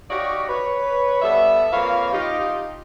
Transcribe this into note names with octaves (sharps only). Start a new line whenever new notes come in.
D#4 F#4 G4 C#5 D5 F5
B4 C#5
G3 B3 A4 E5
F2 A#3 B4 C#5 F5
D#4 F4 G4